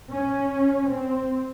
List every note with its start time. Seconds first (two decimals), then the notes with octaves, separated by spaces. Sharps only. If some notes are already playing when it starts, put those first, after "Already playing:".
0.12 C#4
0.92 C4